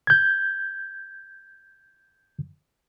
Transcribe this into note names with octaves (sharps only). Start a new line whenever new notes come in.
G6 G#6